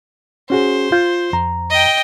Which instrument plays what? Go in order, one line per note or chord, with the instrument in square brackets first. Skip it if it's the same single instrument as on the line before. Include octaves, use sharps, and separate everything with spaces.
[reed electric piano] C#4 F#4 G#4 [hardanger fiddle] C5
[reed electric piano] F4 G6
F2 A#5
[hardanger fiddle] D#5 G5